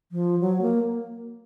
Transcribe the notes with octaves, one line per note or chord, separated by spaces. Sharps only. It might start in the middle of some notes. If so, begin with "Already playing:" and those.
F3
F#3
A#3